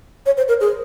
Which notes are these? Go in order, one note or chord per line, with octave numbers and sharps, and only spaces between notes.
C#5
C5
A#4
G#4